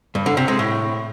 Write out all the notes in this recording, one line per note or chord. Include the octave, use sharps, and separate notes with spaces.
G2
D3
C3
G#3
A2